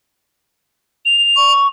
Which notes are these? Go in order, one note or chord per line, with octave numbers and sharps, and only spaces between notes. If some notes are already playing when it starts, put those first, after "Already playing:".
F7
C#6